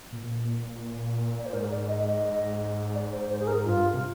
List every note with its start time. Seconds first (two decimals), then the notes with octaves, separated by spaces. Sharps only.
0.12 A#2
1.38 D5
1.46 C5
1.53 G#2 A#4
1.71 D5
1.88 D#5
2.06 D#5
2.95 D5
3.12 C5
3.30 C5
3.40 G#4
3.47 A#4
3.65 G2 F4
3.93 C3